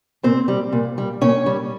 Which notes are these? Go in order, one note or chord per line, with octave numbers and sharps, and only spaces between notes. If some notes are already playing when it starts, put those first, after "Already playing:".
A#2 C4 C5
G3
A#2
G3
A#2 C#4 C#5
G3